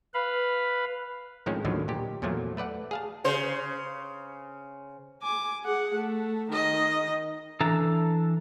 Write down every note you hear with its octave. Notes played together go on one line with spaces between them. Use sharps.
B4 F5 B5
A2 D#3 F3 G#3 C4 C#4
D#2 A2 D3 D#3 F3 F#3
A#2 G4
E2 A#2 F3 F#3 A3
A3 B4 D5 F#5
G#4 F5 A5
C#3 C5
G#5 D6
G#4 F#5
A3
D#3 D#5
E3 D4 A4 A#5